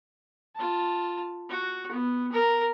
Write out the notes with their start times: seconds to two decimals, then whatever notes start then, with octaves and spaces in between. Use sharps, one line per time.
0.56 F4 A5
1.49 F#4
1.91 B3
2.32 A#4